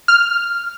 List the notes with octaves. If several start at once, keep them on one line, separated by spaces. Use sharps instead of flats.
F6